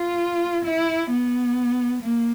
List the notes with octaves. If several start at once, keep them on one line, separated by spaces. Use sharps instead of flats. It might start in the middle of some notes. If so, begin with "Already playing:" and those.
Already playing: F4
E4
B3
A#3